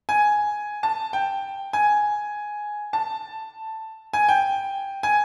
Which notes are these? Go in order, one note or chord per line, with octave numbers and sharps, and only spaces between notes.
G#5
A5
G5
G#5
A5
G#5
G5
G#5